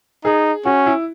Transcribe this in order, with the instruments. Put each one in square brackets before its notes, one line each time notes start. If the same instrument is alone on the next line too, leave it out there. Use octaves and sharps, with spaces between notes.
[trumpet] D#4 [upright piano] G#4
[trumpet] C#4 [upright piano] F#4
[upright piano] E4